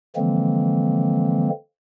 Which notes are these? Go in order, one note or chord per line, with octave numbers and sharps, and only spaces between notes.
D3 E3 F3 G#3 A#3 C4